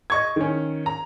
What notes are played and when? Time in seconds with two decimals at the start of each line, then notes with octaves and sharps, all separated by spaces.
0.10 D#5 C#6 G#6
0.36 D#3 C#4
0.86 A#5